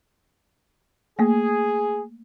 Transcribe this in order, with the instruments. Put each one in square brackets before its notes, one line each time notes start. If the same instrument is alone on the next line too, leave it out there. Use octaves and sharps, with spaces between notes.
[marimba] A3 A#3 [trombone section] G#4